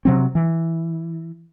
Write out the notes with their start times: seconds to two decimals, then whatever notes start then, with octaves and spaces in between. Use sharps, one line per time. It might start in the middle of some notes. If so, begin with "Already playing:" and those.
0.05 C3 F#3 C4
0.35 E3